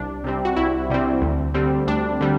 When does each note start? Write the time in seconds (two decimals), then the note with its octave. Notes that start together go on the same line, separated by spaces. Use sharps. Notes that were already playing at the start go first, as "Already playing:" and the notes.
Already playing: C2 D4
0.24 C3 G3 C4
0.45 F#4
0.56 C2 E4
0.90 C3 G3 C4
1.22 D2
1.54 D3 G3 C4
1.87 D2 D4
2.21 D3 G3